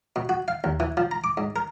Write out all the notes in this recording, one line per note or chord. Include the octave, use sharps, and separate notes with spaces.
B2
F#4
F5
D#2
E3
F3
A#5
D6
G#2
A#4